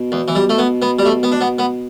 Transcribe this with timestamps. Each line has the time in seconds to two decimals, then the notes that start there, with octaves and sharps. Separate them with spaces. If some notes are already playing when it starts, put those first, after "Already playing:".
Already playing: B2
0.12 E2
0.28 E3
0.35 G3
0.49 A3
0.58 B3
0.82 B3
0.99 G3
1.05 A3
1.23 B3
1.32 D4
1.41 B3
1.59 B3